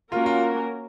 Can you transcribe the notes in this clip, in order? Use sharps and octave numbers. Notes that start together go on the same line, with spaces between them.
A#3 C#4 F4 F#4 A#4
F4